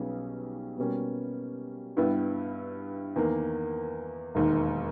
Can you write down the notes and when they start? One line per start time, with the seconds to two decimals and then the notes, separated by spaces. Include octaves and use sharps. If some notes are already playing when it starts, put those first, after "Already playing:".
Already playing: B1 B2 G3 C#4 G#4
0.78 B2 G3 A#3 C#4
1.97 G2 G3 B3 E4
3.16 E2 D#3 A#3
4.35 E1 D#2 D#3 A#3